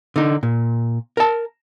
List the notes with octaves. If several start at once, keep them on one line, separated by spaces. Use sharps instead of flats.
D3 D#4
A#2
A#4 A5